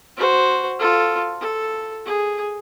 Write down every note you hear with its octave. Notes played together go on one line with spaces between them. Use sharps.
F#4 C5
F4 A4
A4
G#4